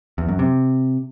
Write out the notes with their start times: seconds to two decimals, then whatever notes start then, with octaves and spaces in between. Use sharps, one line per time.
0.18 E2
0.29 F#2
0.39 C3